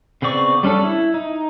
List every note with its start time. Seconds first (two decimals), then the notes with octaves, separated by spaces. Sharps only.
0.22 C#3 B3 C4 D5 C#6
0.63 G3 C#4 D4 A4
0.84 E4
1.14 D#4